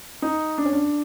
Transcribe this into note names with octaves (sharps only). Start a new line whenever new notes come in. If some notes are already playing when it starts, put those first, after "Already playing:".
D#4
D4
C#4
D4